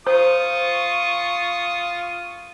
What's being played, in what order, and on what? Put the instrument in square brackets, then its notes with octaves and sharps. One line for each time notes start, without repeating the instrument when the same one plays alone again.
[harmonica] F4 C#6 D#6 [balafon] C5